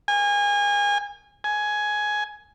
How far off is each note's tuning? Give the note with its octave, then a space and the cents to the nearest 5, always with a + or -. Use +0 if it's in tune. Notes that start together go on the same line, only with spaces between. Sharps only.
G#5 -30
G#5 +10